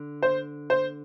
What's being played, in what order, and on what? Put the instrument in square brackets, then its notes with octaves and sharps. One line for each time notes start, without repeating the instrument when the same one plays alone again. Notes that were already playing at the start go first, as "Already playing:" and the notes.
Already playing: [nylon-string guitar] D3
[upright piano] C5
C5